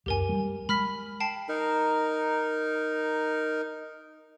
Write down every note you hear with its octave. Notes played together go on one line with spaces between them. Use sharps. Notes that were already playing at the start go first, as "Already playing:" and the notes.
C#2 F#2 G4 A#4 G#5
G3 G#3
G#3 B5 F6 B6
G5 A5 C7
D#4 A#4